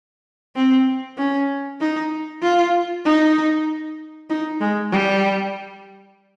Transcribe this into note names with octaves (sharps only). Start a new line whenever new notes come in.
C4
C#4
D#4
F4
D#4
D#4
G#3
G3